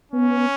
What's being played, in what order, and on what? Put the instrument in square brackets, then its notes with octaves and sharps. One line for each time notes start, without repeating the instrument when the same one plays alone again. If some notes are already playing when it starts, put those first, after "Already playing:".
[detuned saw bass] B3 [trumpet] C#4